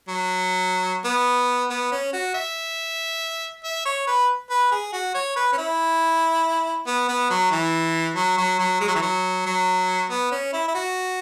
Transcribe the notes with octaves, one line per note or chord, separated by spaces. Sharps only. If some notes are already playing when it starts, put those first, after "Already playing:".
F#3
B3
B3
C#4
F#4
E5
E5
C#5
B4
B4
G#4
F#4
C#5
B4
C#4
E4
B3
B3
F#3
E3
F#3
F#3
F#3
G#3
F#3
E3
F#3
F#3
B3
C#4
E4
E4
F#4